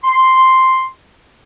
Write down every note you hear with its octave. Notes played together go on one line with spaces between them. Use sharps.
C6